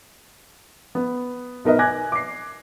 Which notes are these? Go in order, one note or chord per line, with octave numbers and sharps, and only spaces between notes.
B3
B1 D#4 A#4 B4 D#5
G#5 D6 F#6 G#6 A#6
D6 C7